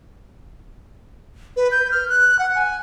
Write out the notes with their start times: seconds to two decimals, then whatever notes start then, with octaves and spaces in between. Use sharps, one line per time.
1.57 B4
1.72 G6
1.92 F6
2.09 F#6
2.39 F#5
2.55 G#5